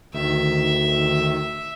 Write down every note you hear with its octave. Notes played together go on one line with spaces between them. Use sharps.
D2 D#3 E5